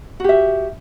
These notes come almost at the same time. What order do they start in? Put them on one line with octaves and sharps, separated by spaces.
F#4 G4 E5